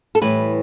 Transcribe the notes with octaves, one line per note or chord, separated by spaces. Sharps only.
A4
A2 E3 G3 B4